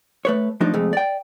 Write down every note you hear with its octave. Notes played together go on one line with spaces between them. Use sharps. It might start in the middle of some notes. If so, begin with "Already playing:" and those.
A3 B4 C#5
F3 A3 D4 D#4
F2 C3 G#3 A3
D5 G5